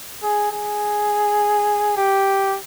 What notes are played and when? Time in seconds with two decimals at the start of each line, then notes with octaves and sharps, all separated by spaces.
0.22 G#4
0.52 G#4
1.97 G4